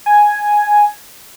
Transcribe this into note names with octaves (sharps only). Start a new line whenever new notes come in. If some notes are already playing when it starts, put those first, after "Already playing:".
G#5